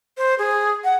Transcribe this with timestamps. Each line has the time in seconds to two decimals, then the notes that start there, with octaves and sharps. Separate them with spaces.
0.18 C5
0.39 G#4
0.84 F#5